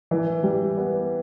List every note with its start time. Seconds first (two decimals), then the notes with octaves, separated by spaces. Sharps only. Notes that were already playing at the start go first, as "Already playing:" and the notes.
0.11 E3
0.43 G3
0.78 B3